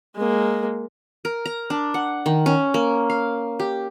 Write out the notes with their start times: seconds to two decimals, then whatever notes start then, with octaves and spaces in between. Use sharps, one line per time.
0.15 G#3 A#3
1.25 A#4
1.46 A#5
1.70 D4
1.94 F#5
2.26 D#3
2.46 C#4
2.74 A#3
3.10 F5
3.60 G4